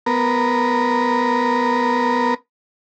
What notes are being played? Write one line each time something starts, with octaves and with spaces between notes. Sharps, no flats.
B3 A#4